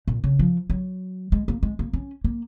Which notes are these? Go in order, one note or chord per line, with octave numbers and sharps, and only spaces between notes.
A#2
C#3
F3
F#3
G#3
A#3
G#3
A#3
C#4
A#3